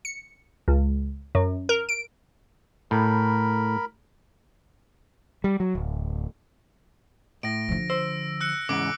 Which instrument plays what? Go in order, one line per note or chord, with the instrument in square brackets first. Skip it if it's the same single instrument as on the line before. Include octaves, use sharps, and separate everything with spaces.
[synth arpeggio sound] C#7
C#2
F#2
A#4
D7
[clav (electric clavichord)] A2 [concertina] A#4 B5
[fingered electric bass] G3
F#3
D1
[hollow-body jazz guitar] A2 [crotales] A#6 D7
[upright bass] D3 F3
[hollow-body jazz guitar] C5 [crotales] E6
[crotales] E6 F#6 C#7
[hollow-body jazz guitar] E2 G#2 C#3 [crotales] D6 D7